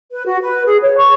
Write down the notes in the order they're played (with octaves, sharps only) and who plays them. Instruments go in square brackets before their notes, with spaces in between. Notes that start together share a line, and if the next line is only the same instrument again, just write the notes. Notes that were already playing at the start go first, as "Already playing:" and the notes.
[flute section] B4
F#4
B4
G#4
C#5
C#6